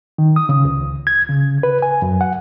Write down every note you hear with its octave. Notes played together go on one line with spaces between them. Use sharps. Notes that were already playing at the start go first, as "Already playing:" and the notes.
D#3
D#6
C#3
C#2
G#6
C#3
B4
G#5
F#2
F#5